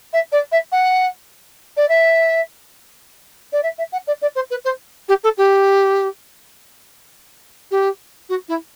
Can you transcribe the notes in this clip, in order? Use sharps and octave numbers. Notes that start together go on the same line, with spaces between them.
E5
D5
E5
F#5
D5
E5
D5
E5
E5
F#5
D5
D5
C5
B4
C5
G4
A4
G4
G4
F#4
E4